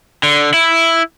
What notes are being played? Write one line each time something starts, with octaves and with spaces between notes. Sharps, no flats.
D3
E4